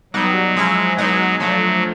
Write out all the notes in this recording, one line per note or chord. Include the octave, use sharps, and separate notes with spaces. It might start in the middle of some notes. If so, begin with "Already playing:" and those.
B2 F#3 G3 B3 D#4
F3 G#3 C#4 E4
B2 F#3 G#3 B3 D#4
D3 F3 F#3 A3